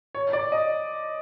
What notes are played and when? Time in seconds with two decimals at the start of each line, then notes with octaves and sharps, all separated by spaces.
0.15 C#5
0.33 D5
0.52 D#5